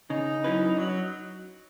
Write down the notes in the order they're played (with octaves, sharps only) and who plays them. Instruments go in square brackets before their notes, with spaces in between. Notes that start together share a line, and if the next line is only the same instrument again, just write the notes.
[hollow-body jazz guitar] C#3 [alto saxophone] D#4
[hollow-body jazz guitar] F#3 C#4 E4 B4
[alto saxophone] F#3